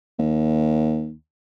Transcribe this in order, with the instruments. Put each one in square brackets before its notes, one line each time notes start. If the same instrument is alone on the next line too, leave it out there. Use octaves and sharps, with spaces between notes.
[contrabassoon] D#2